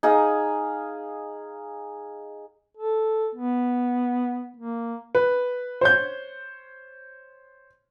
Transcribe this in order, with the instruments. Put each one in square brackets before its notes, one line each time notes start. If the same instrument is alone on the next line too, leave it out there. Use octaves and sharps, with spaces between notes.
[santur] D#4 G#4 F5
[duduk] A4
B3
A#3
[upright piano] B4
C5 C#5 G6